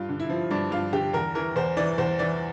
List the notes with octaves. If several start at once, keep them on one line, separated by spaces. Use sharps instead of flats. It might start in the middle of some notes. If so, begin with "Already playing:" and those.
Already playing: G2 F4
D3
E4
F3
G2 D4
G2 F4
D3 G4
E2 A#4
E3 A#4
E2 C5
E3 D5
E2 C5
E3 D5